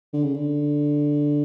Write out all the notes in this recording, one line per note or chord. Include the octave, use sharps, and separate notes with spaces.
D3
C#3
D3